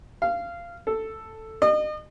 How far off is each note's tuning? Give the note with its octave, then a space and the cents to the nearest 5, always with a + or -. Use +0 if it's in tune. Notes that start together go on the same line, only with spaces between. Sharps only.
F5 -15
A4 +5
D#5 -35